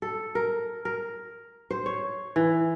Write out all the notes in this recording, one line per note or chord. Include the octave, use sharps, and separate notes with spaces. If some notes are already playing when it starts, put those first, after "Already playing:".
A4
A#4
A#4
C5
C#5
E3